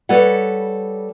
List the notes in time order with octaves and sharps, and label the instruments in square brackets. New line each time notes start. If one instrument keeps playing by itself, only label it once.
[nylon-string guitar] G3 A4 B4 C#5 F#5